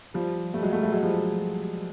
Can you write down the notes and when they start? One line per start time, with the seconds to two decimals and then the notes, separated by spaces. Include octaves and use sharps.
0.14 F3 G3
0.54 G3 A3
0.63 F#3 G#3
0.73 G3 A3
0.83 G3 A3
0.92 F#3 G#3
1.02 F3 G3
1.12 F#3